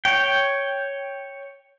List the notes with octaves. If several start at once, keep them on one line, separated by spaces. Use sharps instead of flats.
C#5 G5